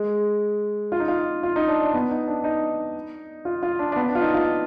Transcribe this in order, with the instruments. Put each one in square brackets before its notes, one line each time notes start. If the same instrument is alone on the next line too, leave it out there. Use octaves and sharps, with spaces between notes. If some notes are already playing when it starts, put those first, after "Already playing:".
Already playing: [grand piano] G#3
F4
D#4
F4
F4
D#4
D4
D4
B3
D#4
D4
D#4
F4
F4
D4
D4
B3
D4
F4
D#4
F4